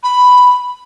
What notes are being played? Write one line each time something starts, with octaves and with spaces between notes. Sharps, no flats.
B5